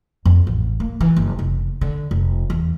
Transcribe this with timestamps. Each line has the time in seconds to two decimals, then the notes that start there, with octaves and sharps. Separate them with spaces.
0.25 F2
0.47 A1
0.80 A#3
1.01 E3
1.16 F#1
1.39 F1
1.81 D3
2.11 F1
2.50 E2